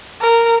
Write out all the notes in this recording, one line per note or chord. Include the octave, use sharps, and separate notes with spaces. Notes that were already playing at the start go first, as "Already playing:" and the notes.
A#4